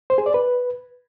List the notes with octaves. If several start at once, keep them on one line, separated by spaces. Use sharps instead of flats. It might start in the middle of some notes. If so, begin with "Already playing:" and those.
C5
G#4
D5
B4